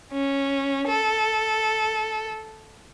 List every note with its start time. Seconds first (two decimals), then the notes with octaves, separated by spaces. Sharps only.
0.13 C#4
0.87 A4